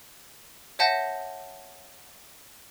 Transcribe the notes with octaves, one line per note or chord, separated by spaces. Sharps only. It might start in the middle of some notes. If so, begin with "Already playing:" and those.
C#5 E5 F#5 A5 G6 A#6